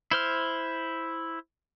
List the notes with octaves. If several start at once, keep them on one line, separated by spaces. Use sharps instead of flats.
E4 C5 F6